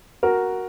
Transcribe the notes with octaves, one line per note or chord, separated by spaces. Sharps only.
F#4 A#4